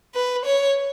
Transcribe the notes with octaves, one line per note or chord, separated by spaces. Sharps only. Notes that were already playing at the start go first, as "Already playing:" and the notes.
B4
C#5